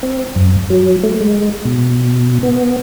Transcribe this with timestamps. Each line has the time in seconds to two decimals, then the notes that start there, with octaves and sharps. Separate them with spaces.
0.03 C4
0.35 F#2
0.70 F#3
1.03 A3
1.21 G#3
1.65 B2
2.43 B3